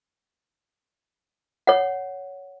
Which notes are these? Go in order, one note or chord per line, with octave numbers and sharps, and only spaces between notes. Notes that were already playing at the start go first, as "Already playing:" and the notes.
C#5 F#5